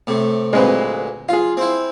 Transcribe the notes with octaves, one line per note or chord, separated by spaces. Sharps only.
A2 C3
D2 A#2 G#3 C4 B4
F4 G#4 F5
C4 E4